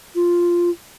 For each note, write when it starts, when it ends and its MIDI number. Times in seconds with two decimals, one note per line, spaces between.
0.15 0.70 65